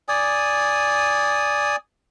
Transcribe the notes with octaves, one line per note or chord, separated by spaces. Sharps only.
D5 G#5 D#6